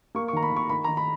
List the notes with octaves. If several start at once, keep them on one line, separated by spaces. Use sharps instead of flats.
A#3 C#6
C#6
D#3 A#5
B5
D#3 C#6
D#3 B5
A#5
D#3
B5